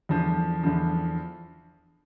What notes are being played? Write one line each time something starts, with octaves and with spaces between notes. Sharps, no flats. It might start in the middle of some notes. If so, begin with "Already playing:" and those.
E2 D3 F3
E2 D3 F3